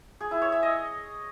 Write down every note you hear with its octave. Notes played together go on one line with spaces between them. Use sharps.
G#4
E4
C#5
E5
D#5